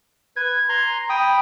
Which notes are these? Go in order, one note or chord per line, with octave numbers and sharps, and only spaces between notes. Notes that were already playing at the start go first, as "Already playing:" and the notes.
B4 G#6
A#5 C6
G5 B5 D#6